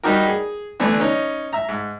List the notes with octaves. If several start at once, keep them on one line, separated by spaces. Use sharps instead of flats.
G3 D#4 F#4 G4 A#4
G#4
D3 E3 A3 B3 D4
C#4 D#4
E5 A#5
G#2